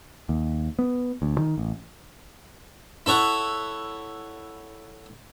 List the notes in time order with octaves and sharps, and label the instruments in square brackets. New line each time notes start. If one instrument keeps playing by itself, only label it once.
[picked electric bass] D#2
B3
D2
D#3
A1
[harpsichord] E4 A4 C#5 F#5